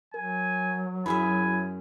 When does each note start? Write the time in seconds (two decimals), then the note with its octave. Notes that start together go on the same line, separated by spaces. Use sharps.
0.14 F#3 A#4 G#5
1.06 F#2 E4 G#4 E5 G#5 B5